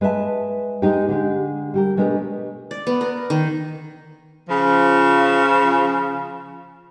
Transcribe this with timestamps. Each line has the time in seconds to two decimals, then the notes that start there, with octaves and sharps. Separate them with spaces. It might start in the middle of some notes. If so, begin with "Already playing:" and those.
0.01 G#3 B4 C#5 E5 A5
0.82 G#3 D#4 G4
1.09 D3 G#3 G4
1.74 G3 G4 A#4
1.97 B2 G#3 A3 D4 G4 A#4
2.71 D5
2.87 B3
3.01 A#4
3.30 D#3
4.48 C#3 F3